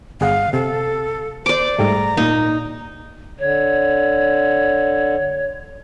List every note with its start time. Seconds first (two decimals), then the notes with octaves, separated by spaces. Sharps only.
0.21 G1 G#4 F5 F#5
0.53 C3 A4
1.46 C5 D5 D6
1.79 G#2 G3 A3 A#5
2.17 A#2 A#3 D#4
3.39 D3 C#5